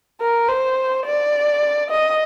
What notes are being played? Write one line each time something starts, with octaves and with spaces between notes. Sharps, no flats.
A#4
C5
D5
D#5